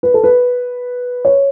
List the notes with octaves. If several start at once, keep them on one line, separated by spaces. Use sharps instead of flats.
B4
A4
B4
C#5